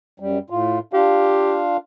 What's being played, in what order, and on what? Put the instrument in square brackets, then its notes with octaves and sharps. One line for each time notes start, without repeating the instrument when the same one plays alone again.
[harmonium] F#2 G3
A2 F4
[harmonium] D4 F4 F5 [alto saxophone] G4